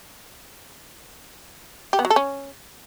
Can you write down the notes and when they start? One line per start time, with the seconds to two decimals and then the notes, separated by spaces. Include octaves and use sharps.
1.93 G4
1.99 B3
2.05 F#3
2.10 A4
2.16 C#4